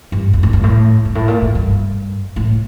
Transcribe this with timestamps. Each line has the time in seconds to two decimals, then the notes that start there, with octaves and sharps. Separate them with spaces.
0.12 G2
0.33 F2
0.43 A2
0.53 G2
0.63 A2
1.05 G2
1.15 A2
1.28 A#2
1.42 A2
1.55 G2
2.36 A2